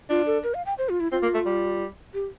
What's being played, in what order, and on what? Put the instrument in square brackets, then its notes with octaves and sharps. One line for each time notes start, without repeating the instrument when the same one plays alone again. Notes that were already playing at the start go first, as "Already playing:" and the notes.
[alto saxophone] D4 [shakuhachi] F4
[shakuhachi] A4
A#4
F5
G5
C5
F4
E4
[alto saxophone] C4 [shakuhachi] F4
[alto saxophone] A#3
A3
G3
[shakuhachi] G4